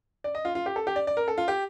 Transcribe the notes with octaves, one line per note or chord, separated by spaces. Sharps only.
D5
D#5
F4
F4
G4
A4
G4
D5
D5
A#4
A4
F4
G4